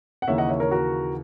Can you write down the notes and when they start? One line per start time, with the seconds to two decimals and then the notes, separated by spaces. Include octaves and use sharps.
0.22 F#5
0.27 D#2 C#3 E3 A#3 C#5 E5
0.38 D#5 F#5
0.49 C#5 E5
0.60 A#4 C#5
0.71 F#4 A#4